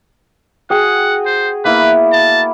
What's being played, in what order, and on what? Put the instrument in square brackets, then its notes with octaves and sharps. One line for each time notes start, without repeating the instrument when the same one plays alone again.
[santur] F#4 G#4 G5 [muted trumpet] F#5
[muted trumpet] C5
[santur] A#3 B3 E4 [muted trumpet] B4
[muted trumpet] A5